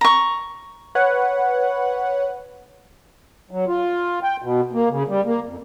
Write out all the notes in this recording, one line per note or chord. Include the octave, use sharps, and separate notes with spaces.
A#5 C#6
B4 C#5 F#5
F#3
F4
G5
B2
A#3
C#3
G3
A#3
F2